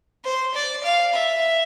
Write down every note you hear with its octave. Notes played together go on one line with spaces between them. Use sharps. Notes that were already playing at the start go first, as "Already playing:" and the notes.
C5
D5
F5
E5